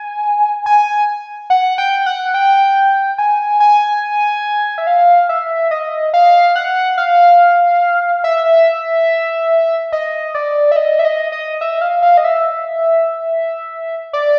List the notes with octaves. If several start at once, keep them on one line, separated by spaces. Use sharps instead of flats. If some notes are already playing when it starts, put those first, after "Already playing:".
Already playing: G#5
G#5
F#5
G5
F#5
G5
G#5
G#5
E5
F5
E5
D#5
F5
F#5
F5
E5
D#5
D5
E5
D#5
E5
D#5
D#5
E5
F5
F5
D#5
E5
D5